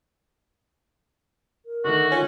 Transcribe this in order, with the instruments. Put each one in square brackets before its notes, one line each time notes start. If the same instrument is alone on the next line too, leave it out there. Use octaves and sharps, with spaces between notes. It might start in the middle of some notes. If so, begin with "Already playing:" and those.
[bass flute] A#4
[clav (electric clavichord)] D3 D#3 A3 [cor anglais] F#4
[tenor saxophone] C#4 [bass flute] F4